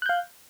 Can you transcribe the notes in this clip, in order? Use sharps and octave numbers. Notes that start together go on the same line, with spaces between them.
F5 F#6 G6